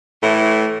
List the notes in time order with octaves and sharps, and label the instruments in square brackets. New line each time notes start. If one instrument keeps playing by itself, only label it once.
[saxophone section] A2 E3 A3